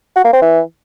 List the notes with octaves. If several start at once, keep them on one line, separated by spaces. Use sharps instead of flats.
F#4
A#3
C4
E3